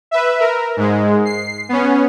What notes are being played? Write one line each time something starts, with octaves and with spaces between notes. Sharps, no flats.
B4 E5
A#4
G#2 G#3
C7
B3 C#4